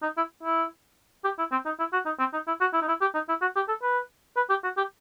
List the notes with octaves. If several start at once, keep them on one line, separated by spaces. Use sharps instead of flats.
D#4
E4
E4
G4
E4
C4
D#4
E4
F#4
D#4
C4
D#4
E4
F#4
E4
D#4
E4
G4
D#4
E4
F#4
G4
A4
B4
B4
G4
F#4
G4